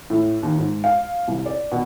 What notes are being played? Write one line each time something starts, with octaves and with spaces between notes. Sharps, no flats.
A2
D#2
G#2
F5
C2
D5
B2